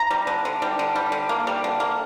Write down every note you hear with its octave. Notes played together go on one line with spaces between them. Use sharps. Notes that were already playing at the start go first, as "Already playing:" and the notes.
Already playing: A#5
G3
D3
D3
G3
D3
G3
D3
A#3
G3
D3
A#3